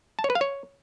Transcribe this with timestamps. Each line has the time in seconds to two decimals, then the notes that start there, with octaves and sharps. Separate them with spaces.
0.19 A5
0.24 C#5
0.30 B4
0.35 F5
0.41 C#5